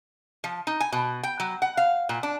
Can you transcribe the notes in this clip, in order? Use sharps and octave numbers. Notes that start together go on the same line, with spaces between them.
F3
D#4
G#5
B2
G5
F#3
F#5
F5
A#2
D4